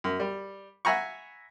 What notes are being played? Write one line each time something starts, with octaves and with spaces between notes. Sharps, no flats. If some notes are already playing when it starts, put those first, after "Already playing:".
F#2
G3
E5 F#5 G#5 A#5 B5 C#6